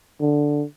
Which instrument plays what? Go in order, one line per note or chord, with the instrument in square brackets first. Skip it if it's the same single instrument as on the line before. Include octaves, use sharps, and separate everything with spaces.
[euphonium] D3